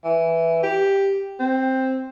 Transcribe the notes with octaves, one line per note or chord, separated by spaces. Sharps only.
E3
G4
C4